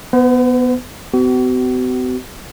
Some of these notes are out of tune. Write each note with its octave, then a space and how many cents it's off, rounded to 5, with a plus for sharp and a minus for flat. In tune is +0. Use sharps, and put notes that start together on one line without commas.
B3 +0 B4 +45
B3 +45 F#4 +40